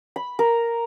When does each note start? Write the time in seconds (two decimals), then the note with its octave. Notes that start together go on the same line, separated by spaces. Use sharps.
0.16 B5
0.39 A#4